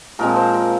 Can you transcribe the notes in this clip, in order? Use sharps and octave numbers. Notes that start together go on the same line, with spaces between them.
A#2 F3 G#3 C4 A#4
C5
A#4